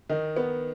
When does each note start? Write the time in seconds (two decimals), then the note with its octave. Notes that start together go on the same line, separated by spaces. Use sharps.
0.10 D#3 D#4
0.36 B3